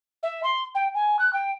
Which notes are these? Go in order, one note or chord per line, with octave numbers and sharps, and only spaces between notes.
E5
C6
G5
G#5
F#6
G5